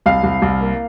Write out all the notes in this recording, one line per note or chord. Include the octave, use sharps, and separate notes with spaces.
C2 F5
C2
C2
A#3